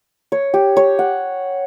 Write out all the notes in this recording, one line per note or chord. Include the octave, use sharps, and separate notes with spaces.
C#5
G4
C#5
F#5